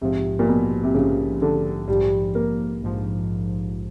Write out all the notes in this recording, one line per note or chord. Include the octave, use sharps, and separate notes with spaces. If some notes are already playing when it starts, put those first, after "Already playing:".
A#1 G#2 C3 F3
A#2
B2
C3
A#1 G#2 C#3 F3
D3
A#1 G#2 F3 G3
A#3
A#1 G#2 F3